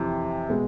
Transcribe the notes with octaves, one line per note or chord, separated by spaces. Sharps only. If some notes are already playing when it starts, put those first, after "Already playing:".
Already playing: F2 C3 E3
B2 G#3 B3